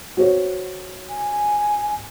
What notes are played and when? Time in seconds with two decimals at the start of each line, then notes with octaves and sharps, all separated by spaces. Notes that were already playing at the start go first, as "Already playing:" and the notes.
0.17 F#4 C5 C#5
1.09 G#5